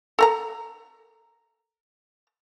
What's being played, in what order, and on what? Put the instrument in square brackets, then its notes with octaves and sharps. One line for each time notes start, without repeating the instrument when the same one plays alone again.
[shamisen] A4 A#4 A#5